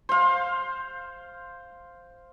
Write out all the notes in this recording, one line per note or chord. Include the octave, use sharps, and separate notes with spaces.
C5 F5